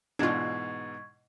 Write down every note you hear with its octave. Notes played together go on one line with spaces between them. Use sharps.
G#2 B2 E3 D4 F4 C#6 G#6